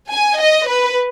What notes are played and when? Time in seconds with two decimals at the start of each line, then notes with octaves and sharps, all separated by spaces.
0.11 G#5
0.40 D#5
0.68 B4